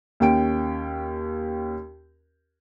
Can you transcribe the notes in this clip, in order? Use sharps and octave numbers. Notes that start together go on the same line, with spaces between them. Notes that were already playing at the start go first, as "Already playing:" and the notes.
D#2 C#4 G5 D7